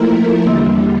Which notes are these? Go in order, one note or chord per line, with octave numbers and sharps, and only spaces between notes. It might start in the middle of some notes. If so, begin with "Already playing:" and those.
Already playing: F3 A3 A#3 E4 A#4
E2 D3 G3 A#3